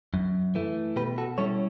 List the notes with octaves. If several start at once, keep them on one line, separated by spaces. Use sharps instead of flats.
F#2
E3 A3
B2 G4 B4
F#4 A4
G3 C#4 E4 A4 C#5